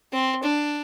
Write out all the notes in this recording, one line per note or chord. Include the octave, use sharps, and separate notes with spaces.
C4
D4